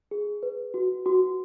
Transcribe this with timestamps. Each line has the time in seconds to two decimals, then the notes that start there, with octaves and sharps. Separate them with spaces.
0.11 G#4
0.43 B4
0.74 F#4
1.06 F#4